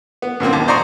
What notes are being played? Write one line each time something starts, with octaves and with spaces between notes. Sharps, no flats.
B3
F#2 A#2 A#3 C4
D#2
C5 D5 A#5 C#6 D#6